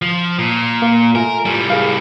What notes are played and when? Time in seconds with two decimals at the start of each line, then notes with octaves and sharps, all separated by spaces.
0.02 F3
0.39 A#2
0.82 A#3
1.15 A3 F4 A#4 G#5
1.45 A2 G3
1.70 G#4 A#4 F5